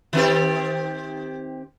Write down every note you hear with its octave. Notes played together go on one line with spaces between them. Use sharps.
D#3 C4 G4